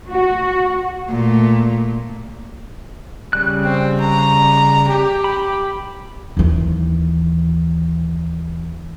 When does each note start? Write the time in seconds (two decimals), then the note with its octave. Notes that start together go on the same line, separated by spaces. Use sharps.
0.12 F#4
1.10 A#2 A3
3.33 C#3 G3 F#6
3.64 C4
4.00 A#5
4.89 G4
5.24 B5
6.37 D#2 E3